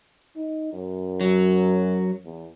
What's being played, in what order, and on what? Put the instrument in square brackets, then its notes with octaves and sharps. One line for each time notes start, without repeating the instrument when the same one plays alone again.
[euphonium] D#4
F#2
[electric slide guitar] F#3
[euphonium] E2